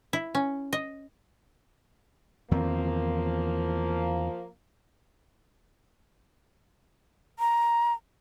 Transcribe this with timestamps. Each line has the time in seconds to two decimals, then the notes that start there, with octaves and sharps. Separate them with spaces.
0.13 E4
0.35 C#4
0.73 D#5
2.51 E2 D#3 F3 A#3 C4
7.39 A#5